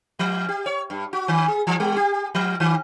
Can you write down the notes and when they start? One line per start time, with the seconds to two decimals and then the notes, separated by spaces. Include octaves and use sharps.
0.19 F3
0.49 G4
0.66 C#5
0.90 G2
1.13 F#4
1.28 D#3
1.48 G#4
1.67 E3
1.80 G3
1.97 G4
2.35 F3
2.60 D#3